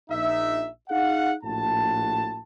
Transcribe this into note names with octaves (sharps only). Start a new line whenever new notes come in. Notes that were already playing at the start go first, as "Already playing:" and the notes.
A#1 D#4 E5
D#4 G#4 F5 F#5
A#1 A2 F#4 A5